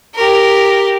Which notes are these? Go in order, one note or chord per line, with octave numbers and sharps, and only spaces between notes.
G4 A#4